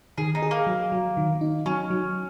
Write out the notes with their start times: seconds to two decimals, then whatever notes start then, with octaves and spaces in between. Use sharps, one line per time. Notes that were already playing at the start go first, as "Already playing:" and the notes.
0.18 D#3 G#4
0.35 D#4
0.42 G#4
0.51 A#3
0.67 F#3
0.92 F#3
1.17 D#3
1.41 D#4
1.66 F#3 C#4
1.90 F#3